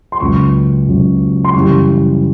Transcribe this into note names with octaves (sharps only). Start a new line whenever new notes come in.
C6
C#2 C#3 F#3 C#6
C#2 C#3 F#3
C6
F#2 C#3 E3 G3 C#6